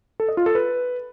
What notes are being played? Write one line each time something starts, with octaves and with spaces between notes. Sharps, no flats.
A4
D#5
F4
A4
B4